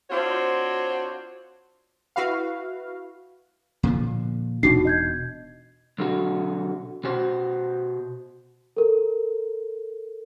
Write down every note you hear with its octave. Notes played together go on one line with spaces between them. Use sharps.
C4 D4 F4 F#4 C5 C#5
E4 F#4 B4 F5
A#2 D3 F3
E1 B2 D4 D#4 F#4 C7
D#5 G6 G#6
B1 D3 F#4
B2 F#4 C5
A4 A#4